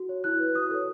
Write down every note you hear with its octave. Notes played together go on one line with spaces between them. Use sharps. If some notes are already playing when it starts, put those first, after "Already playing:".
Already playing: F#4
C#5
E4 F#6
B4
F#4 D#6
A4 C#5